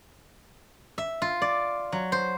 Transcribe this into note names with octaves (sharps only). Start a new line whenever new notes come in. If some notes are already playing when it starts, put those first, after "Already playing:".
E5
F4
D5
F#3
C5